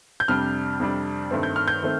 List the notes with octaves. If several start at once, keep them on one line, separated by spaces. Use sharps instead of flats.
G6
F2 C3 G3 D4 F6
F2 C3 G3 D4
G2 D#3 A3 C4
G6
F6
G6
D#3 A3 C4